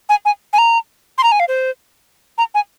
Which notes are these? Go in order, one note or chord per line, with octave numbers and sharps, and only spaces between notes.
G#5
G#5
G#5
A#5
C6
A#5
G#5
F5
C5
A#5
G#5